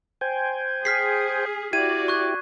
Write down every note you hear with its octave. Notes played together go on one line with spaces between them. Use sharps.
C5 G5 G#5
G#4 F6 B6 C7
E4 F#4 G4 D5 G#6 D#7
C#6 F#6 G#6